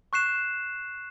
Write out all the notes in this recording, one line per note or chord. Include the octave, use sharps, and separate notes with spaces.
C#6 F#6 C7 E7